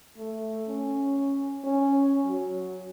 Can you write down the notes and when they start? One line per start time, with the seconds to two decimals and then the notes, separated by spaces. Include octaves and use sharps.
0.17 A3
0.68 C#4
1.64 C#4
2.25 F#3